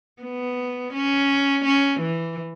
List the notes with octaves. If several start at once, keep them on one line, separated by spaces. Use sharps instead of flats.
B3
C#4
C#4
E3